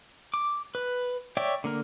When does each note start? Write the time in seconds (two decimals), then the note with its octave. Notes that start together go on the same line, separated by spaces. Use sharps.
0.34 D6
0.75 B4
1.37 C#5 D5 E5 G5
1.64 D3 A#3 A#4